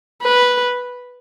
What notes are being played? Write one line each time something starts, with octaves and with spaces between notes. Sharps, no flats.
B4